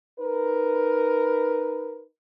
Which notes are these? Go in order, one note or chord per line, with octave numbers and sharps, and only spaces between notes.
D#4 A#4 B4